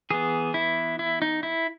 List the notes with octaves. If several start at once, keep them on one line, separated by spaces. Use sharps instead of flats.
E3 B3 G#4
E4
E4
D#4
E4